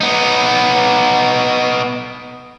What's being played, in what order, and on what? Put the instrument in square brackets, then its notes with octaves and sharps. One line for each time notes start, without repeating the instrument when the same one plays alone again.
[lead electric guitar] B3 D#4